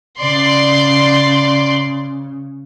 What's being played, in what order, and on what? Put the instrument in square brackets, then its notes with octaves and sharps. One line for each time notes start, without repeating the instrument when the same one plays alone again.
[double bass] C#3 [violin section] D5 C6